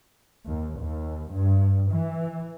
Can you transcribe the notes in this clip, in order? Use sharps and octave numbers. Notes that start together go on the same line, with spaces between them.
D#2
D#2
G2
E3